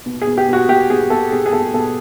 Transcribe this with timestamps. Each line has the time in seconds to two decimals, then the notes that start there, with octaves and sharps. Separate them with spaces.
0.06 B2
0.22 G#4
0.27 B2
0.38 G4
0.48 B2 F#4
0.69 B2 G4
0.90 B2 G#4
1.10 B2 A4
1.32 B2 G#4
1.46 G#4
1.53 B2 A4
1.74 B2 A4